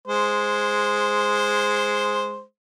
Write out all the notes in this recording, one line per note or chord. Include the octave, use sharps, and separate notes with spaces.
G#3 C5